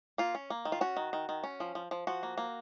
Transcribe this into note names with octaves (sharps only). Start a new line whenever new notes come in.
A#3 F4
C#4
A#3
D#3
F4
C#4 F#4
D#3
D#3
D#3
C#4
F3
F3
F3
F3 F#4
A#3
A#3